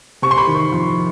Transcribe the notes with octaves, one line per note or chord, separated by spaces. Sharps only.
C3 C#6
C6
B5 C#6
D#3
F2